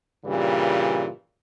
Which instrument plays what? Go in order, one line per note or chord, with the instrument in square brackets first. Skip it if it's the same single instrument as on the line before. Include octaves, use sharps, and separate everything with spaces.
[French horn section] G2 A#2 C#3 E3 G3